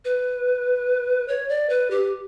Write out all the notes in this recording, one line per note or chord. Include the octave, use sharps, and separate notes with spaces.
B4
C#5
D5
B4
G4